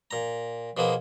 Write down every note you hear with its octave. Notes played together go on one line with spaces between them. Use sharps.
A#2 A#5
B2 F3 A#3 B3 G#4